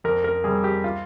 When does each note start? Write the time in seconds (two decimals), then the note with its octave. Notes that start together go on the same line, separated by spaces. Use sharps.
0.04 F2 A#4
0.24 A#4
0.44 C3 G3 G#4
0.64 G4
0.84 F4